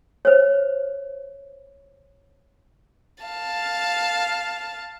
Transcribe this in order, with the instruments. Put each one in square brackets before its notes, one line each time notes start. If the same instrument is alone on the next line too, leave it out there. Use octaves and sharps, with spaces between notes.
[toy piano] C5 C#5
[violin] F5 A5